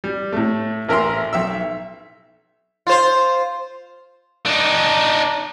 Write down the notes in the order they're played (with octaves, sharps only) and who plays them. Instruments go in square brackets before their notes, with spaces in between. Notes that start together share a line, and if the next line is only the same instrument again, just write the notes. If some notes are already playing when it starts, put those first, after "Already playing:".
[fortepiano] G3
A2 A3
A1 A#4 E5 C6
B1 E5 E6
[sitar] F4 C5
[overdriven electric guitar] D4 D#4